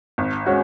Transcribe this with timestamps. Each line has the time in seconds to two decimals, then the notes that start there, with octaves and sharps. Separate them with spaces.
0.18 G#1
0.46 G#3 C#4 F#4